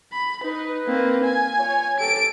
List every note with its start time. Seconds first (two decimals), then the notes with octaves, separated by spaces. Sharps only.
0.12 B5
0.43 D#4 B4
0.87 A#3 C4
1.24 G#5
1.59 F4 C#5
1.99 G4 A4 D7